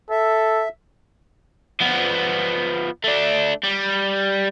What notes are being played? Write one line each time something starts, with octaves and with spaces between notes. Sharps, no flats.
A4 E5
F3 B3
A3 D4
G3